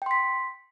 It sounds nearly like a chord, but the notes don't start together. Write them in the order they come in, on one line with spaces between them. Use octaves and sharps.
G5 C6 B6